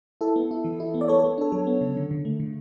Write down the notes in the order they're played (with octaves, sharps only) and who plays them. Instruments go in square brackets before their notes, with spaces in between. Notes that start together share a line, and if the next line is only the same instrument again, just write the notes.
[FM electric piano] E4 A4
B3
E4
E3
E4
B3
D5
B3 A4 C#5
A4 C#5
B3
D4 A4
F#3 A4
B3
C#3
D3
D3
A3
D3